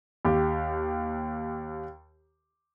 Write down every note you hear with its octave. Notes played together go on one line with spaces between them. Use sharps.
D#2 G4